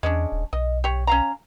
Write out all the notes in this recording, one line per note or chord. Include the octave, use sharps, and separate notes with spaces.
E2 G#3 C#4 D4
D#1
B1 D#5
G4 C#5
C#4 F5 A#5